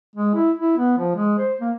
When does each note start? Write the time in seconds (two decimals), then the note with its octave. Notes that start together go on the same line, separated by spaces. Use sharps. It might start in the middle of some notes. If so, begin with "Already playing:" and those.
0.16 G#3
0.35 E4
0.59 E4
0.77 B3
0.98 F3
1.15 G#3
1.38 C5
1.61 A#3